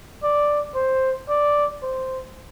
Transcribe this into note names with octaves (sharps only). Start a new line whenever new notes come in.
D5
C5
D5
C5